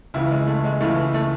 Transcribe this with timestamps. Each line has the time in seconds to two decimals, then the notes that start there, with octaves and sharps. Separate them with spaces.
0.14 C#2 C#3 E3 E4
0.31 G#3
0.48 A3
0.64 G#3
0.81 C#2 C#3 E3 A3
1.14 A3